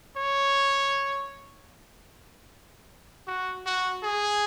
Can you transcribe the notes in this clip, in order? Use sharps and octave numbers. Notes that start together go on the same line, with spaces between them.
C#5
F#4
F#4
G#4